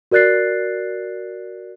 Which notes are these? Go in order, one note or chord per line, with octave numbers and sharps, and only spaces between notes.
F#4 A#4 D5 F#6 A6 C7